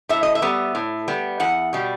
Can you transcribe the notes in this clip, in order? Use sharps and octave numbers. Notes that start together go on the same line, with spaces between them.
A2 E5
D#5
E5
G3 B3
A2
G3 B3
E2 F#5
B2 G3